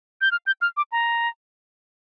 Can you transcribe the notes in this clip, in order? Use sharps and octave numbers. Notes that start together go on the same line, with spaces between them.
G6
F6
G6
F6
D6
A#5